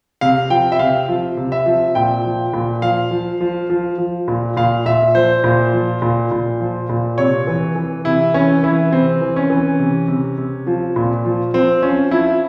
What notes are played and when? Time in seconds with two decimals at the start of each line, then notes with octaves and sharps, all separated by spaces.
0.21 C3 F5
0.50 F3 G5
0.72 E5
0.79 C3 F5
1.09 F3
1.37 C3
1.52 E5
1.66 F3
1.95 A#2 G5
2.25 F3
2.53 A#2
2.82 F3 F5
3.11 F3
3.41 F3
3.70 F3
3.98 F3
4.28 A#2
4.57 A#2 F5
4.86 A#2 E5
5.15 F3 C5
5.44 A#2
5.73 F3
6.02 A#2
6.31 A#2
6.60 F3
6.89 A#2
7.18 C3 C#5
7.47 E3
7.76 E3
8.05 C3 E4
8.34 E3 C#4
8.63 E3 E4
8.92 C3 C4
9.21 E3
9.36 C#4
9.50 E3
9.79 C3
10.08 C3
10.38 C3
10.67 F3
10.96 A#2
11.25 F3
11.54 F3 C4
11.82 F3 C#4
12.11 F3 E4